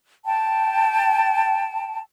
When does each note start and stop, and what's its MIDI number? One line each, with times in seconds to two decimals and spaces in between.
0.25 1.99 79
0.25 1.99 81